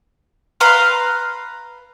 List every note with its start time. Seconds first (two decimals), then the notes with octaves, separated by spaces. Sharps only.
0.60 B4 F5 A#5 C6